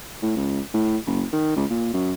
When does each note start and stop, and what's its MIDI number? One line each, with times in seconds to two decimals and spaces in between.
0.22 0.34 45
0.36 0.61 37
0.73 0.97 45
1.06 1.24 30
1.33 1.51 51
1.56 1.65 37
1.70 1.90 46
1.94 2.13 42